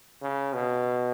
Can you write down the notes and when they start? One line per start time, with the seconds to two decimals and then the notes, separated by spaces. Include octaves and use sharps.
0.22 C#3
0.53 B2